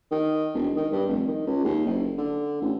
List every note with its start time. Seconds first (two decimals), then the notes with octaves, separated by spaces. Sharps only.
0.11 D#3
0.54 E1
0.76 D#3
0.92 G2
1.09 F1
1.27 D#3
1.47 C#2
1.64 D#2
1.86 F#1
2.18 D3
2.62 A1